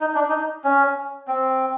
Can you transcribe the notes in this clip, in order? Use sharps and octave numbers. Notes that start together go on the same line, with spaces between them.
D#4
D4
D#4
C#4
C4